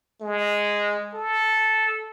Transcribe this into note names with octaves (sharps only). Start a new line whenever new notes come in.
G#3
A4